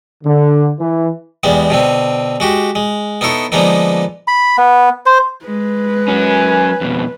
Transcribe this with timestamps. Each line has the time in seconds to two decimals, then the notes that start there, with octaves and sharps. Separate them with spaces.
0.24 D3
0.80 E3
1.43 E2 G3 G#3 B3
1.70 B2 D3 C4
2.40 G#3 F#4 G4
2.75 G#3
3.21 B3 D#4 E4 A4 C#5
3.52 D3 F3 G#3 A#3 B3 D#4
4.27 B5
4.58 B3
5.06 C5
5.45 G#3 B4
6.08 F#3 C#4 G#5
6.81 F2 B2